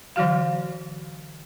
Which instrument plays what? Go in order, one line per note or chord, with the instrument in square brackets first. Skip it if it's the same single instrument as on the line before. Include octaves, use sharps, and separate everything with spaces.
[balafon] D3 E3 F#3 F#4 F5